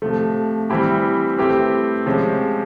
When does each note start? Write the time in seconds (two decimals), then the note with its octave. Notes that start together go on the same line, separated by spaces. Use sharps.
0.02 C3 F3 A3
0.70 E3 G3 C4 E4 G4
1.38 A3 C4 E4 G4 B4
2.06 C3 F3 G#3 C#4